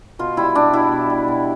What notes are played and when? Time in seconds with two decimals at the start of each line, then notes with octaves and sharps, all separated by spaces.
0.19 B2 F4
0.37 G3 E4
0.55 B2 D4
0.73 B2 E4
0.92 B2
1.10 G3
1.28 B2